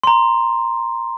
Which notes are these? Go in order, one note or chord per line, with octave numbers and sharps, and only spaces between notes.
A#5 C6